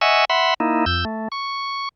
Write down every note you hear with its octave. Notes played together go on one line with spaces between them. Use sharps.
D#5 E5 F#5 G#5 C#6 E6
E5 F#5 B5 C6
A#3 D#4 E4
F2 E6 G6
A3
C#6